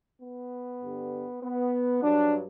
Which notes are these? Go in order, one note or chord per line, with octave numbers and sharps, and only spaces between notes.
B3
G2 D3 G3
B3
G2 F#3 D4